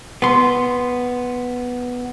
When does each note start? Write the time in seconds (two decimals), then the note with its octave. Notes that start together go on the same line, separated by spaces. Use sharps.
0.22 B3 C6